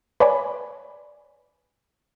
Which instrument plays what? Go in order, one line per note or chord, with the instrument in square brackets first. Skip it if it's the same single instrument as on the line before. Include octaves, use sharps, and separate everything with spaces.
[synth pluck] B4 C#5 D5 G#5 B5